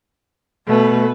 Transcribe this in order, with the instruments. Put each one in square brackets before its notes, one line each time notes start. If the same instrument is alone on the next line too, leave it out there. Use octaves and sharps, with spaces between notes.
[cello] B2 [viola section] A3 B4